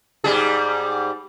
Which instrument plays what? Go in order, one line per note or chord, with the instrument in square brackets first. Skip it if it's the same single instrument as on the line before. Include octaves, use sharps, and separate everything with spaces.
[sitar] G#2 G3 G#4